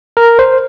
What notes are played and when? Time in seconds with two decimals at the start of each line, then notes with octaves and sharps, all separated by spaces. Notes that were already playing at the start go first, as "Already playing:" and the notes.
0.17 A#4
0.39 C5